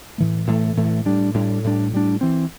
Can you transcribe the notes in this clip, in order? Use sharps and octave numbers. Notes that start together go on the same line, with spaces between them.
A2 E3 A3
A2 E3 A3
A2 E3 A3
A2 G3 D4
A2 G3 D4
A2 G3 D4
A2 G3 D4
E3 C4